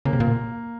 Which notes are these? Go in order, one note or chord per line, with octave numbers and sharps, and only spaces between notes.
C#3 A#3
C3
A#2